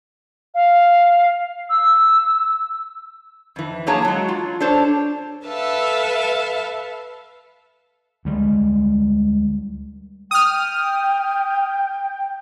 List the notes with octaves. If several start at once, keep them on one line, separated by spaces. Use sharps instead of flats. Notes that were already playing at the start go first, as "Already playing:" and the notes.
F5
E6
F2 E3
F#3 A#3 G#4 C#5 A5 A#5
F#3 G#3
F4
D4 A4 C5 C#5
A4 B4 E5 F5 A5
D2 G3 G#3
G5 D#6 F6